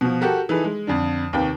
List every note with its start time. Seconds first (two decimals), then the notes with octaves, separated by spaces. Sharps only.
0.01 B2 F3
0.21 F#4 G4 A4 A#4
0.49 E3 D#4 G#4 A4 B4
0.64 G#3
0.87 F2 D3 D4
1.33 D#2 C3 B4 G5